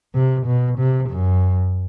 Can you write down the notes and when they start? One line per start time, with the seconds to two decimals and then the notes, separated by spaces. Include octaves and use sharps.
0.15 C3
0.46 B2
0.78 C3
1.10 F#2